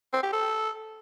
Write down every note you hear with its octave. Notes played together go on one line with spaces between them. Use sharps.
C4
G4
A4